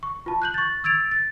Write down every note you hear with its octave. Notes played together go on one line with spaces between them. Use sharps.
C#6
F4 A5
F#6 G6 F#7
C#6 A6
E6 G#6 A6 D7 F7
A6